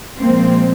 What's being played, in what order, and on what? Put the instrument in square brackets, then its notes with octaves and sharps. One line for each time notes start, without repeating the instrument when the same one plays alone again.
[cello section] A#2 F3 G#3 A#3 C4